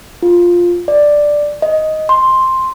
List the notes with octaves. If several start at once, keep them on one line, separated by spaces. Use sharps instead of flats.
F4
D5
D#5
C6